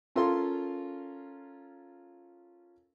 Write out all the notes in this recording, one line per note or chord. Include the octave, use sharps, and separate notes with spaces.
C#4 F4 A4 A#4 F5 C6